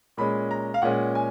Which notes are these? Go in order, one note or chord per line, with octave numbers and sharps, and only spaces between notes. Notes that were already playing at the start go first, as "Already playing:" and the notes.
A#2 G#3 C#4 B5
A#5
F5
A#2 G#3 C#4 F#5
G#5